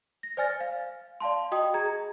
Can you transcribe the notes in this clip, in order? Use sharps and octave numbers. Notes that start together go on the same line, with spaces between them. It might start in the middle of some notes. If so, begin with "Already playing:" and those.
A#6
C5 D5 G#5 F6 A6
F5
D5 F5 A5 C6
F#4 D#5 G5 D#6
G#4 A#5 G#6